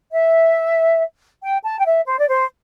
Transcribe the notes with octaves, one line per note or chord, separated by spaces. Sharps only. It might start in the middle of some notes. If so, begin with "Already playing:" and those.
E5
G5
A5
G5
E5
C5
D5
C5